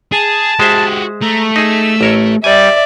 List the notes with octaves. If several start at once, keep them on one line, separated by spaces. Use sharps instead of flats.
G#4 A5
G#3 F#4 G4 C5 E5
A3 A#5
D#4 G#4 E6
A1 A#4 C#5
G3 D5 E5 G#5